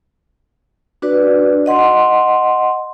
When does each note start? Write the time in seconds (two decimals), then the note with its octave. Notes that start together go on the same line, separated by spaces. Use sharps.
1.02 D4 F#4 B4 D5
1.66 D#5 F#5 C6